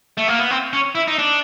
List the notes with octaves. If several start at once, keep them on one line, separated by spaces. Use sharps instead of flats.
A3
A#3
B3
C4
C#4
E4
D#4
D4